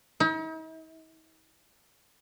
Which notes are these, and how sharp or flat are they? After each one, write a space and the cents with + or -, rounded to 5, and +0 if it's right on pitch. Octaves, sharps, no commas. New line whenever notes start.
D#4 +45